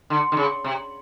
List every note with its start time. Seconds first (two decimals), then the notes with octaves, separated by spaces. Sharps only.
0.10 D3
0.32 D3
0.37 C#3
0.64 C3